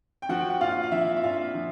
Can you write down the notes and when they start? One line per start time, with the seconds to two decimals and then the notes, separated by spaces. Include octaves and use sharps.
0.22 G5
0.29 F3 F#4 F#5
0.41 G5
0.50 F#5
0.61 A#2 F4 F5
0.83 F5
0.91 F3 E4 E5
1.17 E5
1.24 A#2 F4 F5
1.55 F3